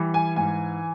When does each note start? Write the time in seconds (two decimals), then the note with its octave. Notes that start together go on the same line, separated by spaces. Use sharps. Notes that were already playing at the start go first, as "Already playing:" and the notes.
Already playing: E3 G3
0.14 G#5
0.36 G#2 G#5